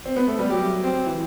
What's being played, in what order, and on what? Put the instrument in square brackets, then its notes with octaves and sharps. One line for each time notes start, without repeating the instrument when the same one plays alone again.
[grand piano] C4
B3
A3
G3
[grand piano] F#3 [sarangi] G4
[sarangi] C4
[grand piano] E3